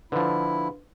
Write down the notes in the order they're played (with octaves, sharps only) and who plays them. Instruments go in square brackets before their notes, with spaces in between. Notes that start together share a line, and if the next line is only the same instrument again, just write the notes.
[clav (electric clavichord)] D3 F3 [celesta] D4 B4 [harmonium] E4